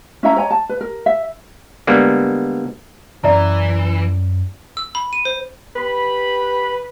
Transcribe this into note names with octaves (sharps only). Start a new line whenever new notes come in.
C#4 E4 E5 A#5
C#5 D#5 G#5 A#5
A5
B4
A#4
E5
D3 G3 G#3 A#3 B3
F#2 E3 B3 C#4 D5 E5 A#5
E6
B5
D#7
C5
G4 B4 B5